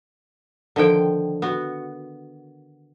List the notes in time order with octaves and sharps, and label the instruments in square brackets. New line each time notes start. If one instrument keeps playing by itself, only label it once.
[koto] D3 D#3 F3 G5
B3 F#4